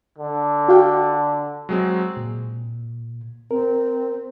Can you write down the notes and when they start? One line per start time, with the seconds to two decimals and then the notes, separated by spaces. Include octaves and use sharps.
0.18 D3
0.68 F#4 F5 G5
1.69 F#3 G#3 C4
2.17 A#2
3.51 C4 A#4